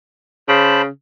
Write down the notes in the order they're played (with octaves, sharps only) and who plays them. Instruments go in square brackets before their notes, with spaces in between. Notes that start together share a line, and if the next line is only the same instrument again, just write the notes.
[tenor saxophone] C#3 [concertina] C5 A5 B5